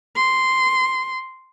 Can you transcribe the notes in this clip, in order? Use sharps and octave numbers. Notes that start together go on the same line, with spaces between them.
C6